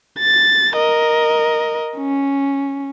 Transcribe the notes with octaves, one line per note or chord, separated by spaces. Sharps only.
A6
A#4 D#5
C#4